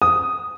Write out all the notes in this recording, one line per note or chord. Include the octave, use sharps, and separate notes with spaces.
D#6